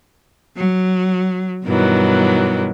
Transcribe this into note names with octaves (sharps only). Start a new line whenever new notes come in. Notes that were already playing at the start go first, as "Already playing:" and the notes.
F#3
G2 B2 D#3 E3 F#3